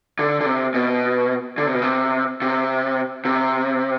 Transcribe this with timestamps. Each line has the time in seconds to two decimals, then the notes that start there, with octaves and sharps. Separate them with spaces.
0.19 D3
0.40 D3
0.46 C3
0.74 B2
1.58 D3
1.66 C3
1.74 B2
1.82 C3
2.42 C3
3.25 C3